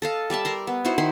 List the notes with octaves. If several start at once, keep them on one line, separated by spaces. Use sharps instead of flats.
A4 D#5 F5
G3 D5 E5 A5
A#4 A#5 C6
B3
D#4 E4 F#4 C5
D#3 D#4 E4 C6